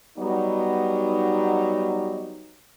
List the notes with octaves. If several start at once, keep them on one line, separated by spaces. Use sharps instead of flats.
F#3 G3 B3 D#4